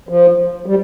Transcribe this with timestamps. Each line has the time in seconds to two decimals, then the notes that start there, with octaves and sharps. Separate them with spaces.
0.09 F3
0.66 G3